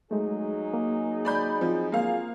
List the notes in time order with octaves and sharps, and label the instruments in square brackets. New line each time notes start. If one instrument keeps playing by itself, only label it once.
[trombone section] F#3 D#4 G#4 [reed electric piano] G#3 A3
[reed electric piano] A#3
[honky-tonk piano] D5 B5 G6
[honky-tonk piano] F3 [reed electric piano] C4
[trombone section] F#3 F4 G#4 [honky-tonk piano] A#3 F5